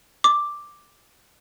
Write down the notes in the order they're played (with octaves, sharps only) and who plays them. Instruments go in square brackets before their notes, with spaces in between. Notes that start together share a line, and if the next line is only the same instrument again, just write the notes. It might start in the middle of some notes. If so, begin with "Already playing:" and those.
[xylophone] D6